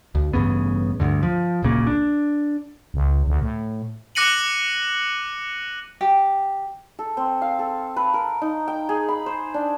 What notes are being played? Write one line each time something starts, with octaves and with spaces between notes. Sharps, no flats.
D2
A1 G2 C#3 B3
D2 G2 D3
F3
D1 A#1 C#3 A#3
D4
C#2
D2
A2
D6 F#6 A#6 C#7 D#7 F#7
G4
A4
C4
F5
A4
B4
A#4
D#4
G5
G#4
B5
C5
D4